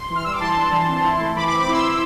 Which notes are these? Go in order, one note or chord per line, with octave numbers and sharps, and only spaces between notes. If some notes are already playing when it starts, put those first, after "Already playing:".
Already playing: C6
E3
F6
G3 E6
D6
E3 A5 C6
D4
E3
C4
E4
A3
E3 B5 D6
B5 D6
C4
B5 D6
E4 C6 E6
E4